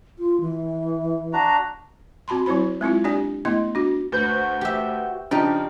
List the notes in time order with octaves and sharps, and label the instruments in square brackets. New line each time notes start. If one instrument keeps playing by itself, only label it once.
[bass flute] F4
E3
[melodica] D4 F#4 A#5
[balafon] C4 F#4 A5 B5 C6
F#3 C4 E4 C5 B5
G#3 C4 E4 F4
D4 G4 D5 G#5
A3 B3 E4 D#5 C6
D4 F#4
[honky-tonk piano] D2 [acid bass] F#4 [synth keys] B4 C5 G6
[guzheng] G4 E5
[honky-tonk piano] C#3 F3 [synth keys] D4 [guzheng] D#4 G4 D5